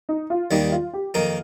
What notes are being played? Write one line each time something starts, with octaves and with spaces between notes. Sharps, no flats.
D#4
F4
D#2 D#3 G3 A#3 D#4
F4
G4
F2 D#3 A#3 D#4 A#4